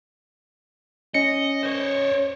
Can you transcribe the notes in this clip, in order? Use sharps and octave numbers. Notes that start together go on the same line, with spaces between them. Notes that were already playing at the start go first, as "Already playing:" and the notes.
C#4 D#5 C#7
C5 C#5